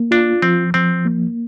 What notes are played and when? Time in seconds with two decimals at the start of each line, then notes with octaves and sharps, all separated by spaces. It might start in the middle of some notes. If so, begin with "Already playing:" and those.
Already playing: A#3
0.11 D4 F4
0.42 F3 C4
0.74 F3 C4
1.05 A#3